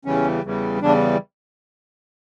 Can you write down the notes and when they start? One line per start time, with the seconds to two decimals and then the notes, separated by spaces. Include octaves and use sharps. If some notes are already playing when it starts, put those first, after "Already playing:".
0.05 E2 C#3 E3 G3 C#4
0.43 E2 C#3 E3 G3
0.81 E2 C#3 E3 G3 D4